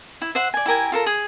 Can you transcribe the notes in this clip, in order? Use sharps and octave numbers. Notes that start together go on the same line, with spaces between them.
E4
C5 E5 F#5
D5 G#5
E4 G4 A#4 G#5
F4 A4 A#4
G#4